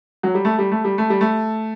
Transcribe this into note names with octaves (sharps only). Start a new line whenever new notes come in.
F#3
G3
A3
G3
A3
G3
A3
G3
A3